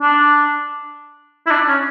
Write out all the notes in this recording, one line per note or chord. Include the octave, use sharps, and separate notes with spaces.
D4
E4
D4
C#4